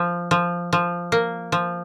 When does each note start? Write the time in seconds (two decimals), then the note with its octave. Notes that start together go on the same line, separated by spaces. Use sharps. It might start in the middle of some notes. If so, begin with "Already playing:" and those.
Already playing: F3
0.31 F3
0.73 F3
1.12 A#3
1.52 F3